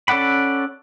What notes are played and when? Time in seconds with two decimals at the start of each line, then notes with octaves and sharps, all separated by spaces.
0.08 C#4 A4 D5 F#5 B5